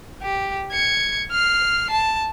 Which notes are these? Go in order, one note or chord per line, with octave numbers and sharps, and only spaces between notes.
G4
G#6 C#7
F6 C7
A5